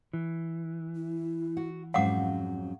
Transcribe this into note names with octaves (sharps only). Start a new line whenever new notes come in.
E3
E4
F#4
F2 G#2 F#3 C#4 F5 F#5 D6